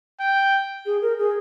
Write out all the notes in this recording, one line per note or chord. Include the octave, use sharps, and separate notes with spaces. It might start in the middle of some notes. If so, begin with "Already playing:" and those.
G5
G#4
A#4
G#4